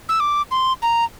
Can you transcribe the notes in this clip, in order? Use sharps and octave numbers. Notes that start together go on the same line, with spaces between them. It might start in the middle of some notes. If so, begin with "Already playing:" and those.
E6
D6
C6
A#5